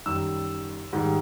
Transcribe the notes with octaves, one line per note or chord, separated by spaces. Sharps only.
F#2 D#3 G3 E6
G#2 D#3 G3